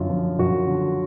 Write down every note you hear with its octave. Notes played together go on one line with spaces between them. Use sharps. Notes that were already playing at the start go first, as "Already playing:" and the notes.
Already playing: F#2 D3 F4
F3
F#2 F#4
D3